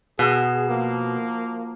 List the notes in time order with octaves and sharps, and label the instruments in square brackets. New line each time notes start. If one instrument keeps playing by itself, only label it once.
[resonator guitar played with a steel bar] B2 [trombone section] G#4
[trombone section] F3 A#3